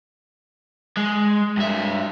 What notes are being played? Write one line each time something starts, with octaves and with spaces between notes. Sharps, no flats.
G#3
G2 E5